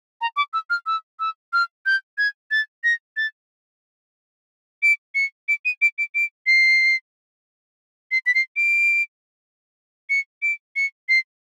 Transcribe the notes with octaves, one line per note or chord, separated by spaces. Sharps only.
A#5
D6
E6
F6
E6
E6
F6
G6
G#6
A6
A#6
A6
D7
C#7
D7
D#7
D7
D7
D7
C7
C7
B6
C7
D7
C#7
D7
C#7
C7